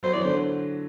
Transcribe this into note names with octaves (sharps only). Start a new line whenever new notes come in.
F#3 C5
E3 D5
D3 C5